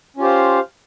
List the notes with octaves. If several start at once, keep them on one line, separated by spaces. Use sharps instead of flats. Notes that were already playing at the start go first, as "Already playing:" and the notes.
C#4 F4 G4 C5 F5